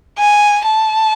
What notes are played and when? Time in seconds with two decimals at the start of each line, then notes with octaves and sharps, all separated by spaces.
0.18 G#5
0.65 A5